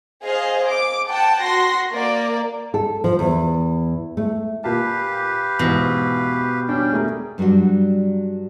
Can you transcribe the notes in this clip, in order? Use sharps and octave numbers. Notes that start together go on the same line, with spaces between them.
G#4 C5 D#5 F5
D6
F#5 G5 A5
F#4 C6 A#6
A#3 D5
A4
F3
E2
A3
A#2 G4 B4 F5 A5
E2 G#2 B2
G3 C#4 D4 G5
A3 G#4 A#4
G2 F#3 G3 D4 F#4